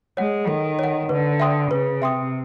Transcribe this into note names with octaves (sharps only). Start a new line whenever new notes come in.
G#3 C#5 F#5
D#3 A4
C#5 F#5
D3 B4
E5 G5 C6 D#6
C#3 B4
C3 E5 G5 C6 D#6